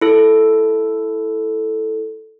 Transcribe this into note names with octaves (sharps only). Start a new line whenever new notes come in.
E4 A4